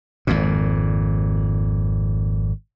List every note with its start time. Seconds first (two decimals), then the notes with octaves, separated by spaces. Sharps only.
0.27 G#1 F2 A#2